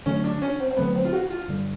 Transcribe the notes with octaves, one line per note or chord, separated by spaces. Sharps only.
D3 F#3 A3 C#4
D4
C#4
C4
C4
D3 F#3 A3 B3
C4
F4
F#4
F4
G2 D3 G3